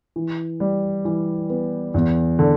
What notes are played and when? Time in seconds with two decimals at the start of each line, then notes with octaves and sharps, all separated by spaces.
0.16 E3
0.60 G3
1.05 E3
1.50 B3
1.94 E2
2.39 D3